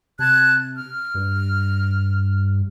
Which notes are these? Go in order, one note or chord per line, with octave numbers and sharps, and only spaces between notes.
C3 A5 F#6 G#6
F6
G2